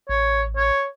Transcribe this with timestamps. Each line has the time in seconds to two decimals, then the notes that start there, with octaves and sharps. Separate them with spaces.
0.09 A1 C#5
0.57 C#5